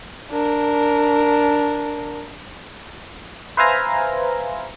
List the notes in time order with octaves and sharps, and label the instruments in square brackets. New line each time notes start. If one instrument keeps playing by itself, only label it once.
[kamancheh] D4 A#4
[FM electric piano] B4 C5 E5 F5 G#5 A#5